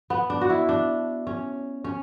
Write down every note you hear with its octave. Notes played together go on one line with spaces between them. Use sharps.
B3
D4
F#4
E4
D4
C#4
C#4